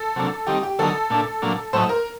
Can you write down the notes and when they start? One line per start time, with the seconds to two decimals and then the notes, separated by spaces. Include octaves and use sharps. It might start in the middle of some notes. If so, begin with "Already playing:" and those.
Already playing: A4
0.16 C3 F#3 A#3 D4
0.47 D#3 G3 C4 D#4 G4
0.63 G4
0.79 D3 F#3 A#3 D#4 A4
1.10 A#2 A3 D4
1.42 A#2 F#3 A#3 D4
1.73 A2 F#3 A3 D#4 C5
1.89 A#4